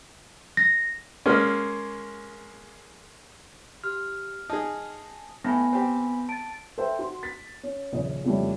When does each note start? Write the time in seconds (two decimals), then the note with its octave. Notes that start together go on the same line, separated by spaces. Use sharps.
0.57 A#6
1.26 G#3 A#3 C#4
3.84 G4 F6
4.49 D#4 G#4 A5
5.44 A2 B3 G#5 B5 A#6
5.73 C4 G4
6.29 A5 A6 D7
6.78 A4 C5 E5 G5
6.99 F#4 C6
7.23 A6 B6
7.63 C#4
7.92 D#1 A#1 C#3 C#5 D#5
8.25 F2 C#3 E3 G3 A3 C#4